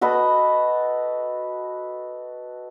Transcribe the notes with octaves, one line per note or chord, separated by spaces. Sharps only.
F#4 A4 B4 D#5